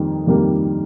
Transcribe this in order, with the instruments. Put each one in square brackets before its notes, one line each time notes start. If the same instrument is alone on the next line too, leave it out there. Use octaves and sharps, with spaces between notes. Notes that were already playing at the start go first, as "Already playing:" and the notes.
Already playing: [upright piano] F2 D#3 G3 A#3
F2 D#3 G3 A#3